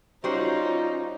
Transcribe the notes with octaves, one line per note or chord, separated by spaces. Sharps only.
G3 C#4 D#4 F4 F#4 C5